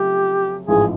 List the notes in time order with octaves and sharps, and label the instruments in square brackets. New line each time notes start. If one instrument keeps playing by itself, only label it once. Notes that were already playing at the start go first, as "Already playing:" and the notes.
Already playing: [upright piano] F2 C#3 F#3 A3 [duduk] G4
[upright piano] A1 G#2 F3 [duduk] G#4